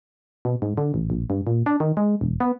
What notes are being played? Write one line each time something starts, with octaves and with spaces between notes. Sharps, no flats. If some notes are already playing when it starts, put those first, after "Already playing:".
B2
G#2
D3
A1
A#1
G2
A#2
D4
D#3
G#3
E1
B3